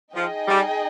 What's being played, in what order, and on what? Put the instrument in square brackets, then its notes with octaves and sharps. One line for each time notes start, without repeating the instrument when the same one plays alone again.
[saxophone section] F3 [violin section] D#4 G#4 D#5 G5
[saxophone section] G3